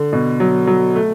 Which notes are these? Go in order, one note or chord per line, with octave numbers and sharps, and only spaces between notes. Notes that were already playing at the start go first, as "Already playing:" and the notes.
Already playing: D3
B2
F#3
F#3
A3